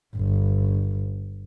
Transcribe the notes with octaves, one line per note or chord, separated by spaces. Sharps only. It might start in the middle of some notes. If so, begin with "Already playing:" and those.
G1